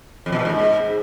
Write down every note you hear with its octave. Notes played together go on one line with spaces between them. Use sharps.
F2
B2
A#2
G#2